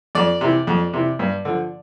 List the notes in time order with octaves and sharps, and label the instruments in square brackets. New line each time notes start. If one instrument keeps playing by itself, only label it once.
[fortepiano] F2 D5
C3 E3
F2
C3 E3
G2
D3 F3